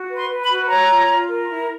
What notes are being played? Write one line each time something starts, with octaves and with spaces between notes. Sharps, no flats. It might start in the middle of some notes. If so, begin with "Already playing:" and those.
Already playing: F#4
B4
C6
B4
B5
F#4
C#5 A#5
F4
F4
A#4
E4